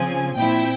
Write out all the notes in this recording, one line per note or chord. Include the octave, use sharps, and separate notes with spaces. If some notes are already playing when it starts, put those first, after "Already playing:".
Already playing: C#3 F3 C4 G#5
A#2 F3 C4 E4 G5